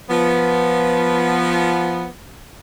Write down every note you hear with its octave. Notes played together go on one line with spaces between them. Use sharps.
F3 B3